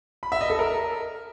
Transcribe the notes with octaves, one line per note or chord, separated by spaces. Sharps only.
B5
E5
D#5
A4
A#4